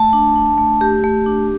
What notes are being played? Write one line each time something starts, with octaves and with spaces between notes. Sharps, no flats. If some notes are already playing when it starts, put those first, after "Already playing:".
Already playing: A3 A5
D4
D4
A3
A3 G4
A3
D4